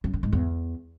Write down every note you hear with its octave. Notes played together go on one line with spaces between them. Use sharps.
F#2
D3
G#2
E2